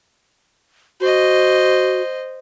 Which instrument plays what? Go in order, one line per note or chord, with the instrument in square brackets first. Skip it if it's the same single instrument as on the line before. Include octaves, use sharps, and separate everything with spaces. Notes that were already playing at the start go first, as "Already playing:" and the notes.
[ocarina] F#4 [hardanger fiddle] C5 D#5